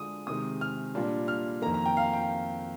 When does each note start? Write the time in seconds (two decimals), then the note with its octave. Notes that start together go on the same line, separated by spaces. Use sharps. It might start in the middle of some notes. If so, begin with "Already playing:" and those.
Already playing: D3 G#3 D4 F4 D#6
0.27 C3 D#3 G#3 D#6
0.61 F6
0.95 A#2 G3 D4 F4
1.28 F6
1.62 F2 D#3 A#3 A#5
1.74 A#5
1.86 G5
1.97 F5
2.13 G5